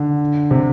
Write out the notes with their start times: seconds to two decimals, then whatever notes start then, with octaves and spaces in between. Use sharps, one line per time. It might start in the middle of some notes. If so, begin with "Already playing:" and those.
Already playing: D3
0.51 C3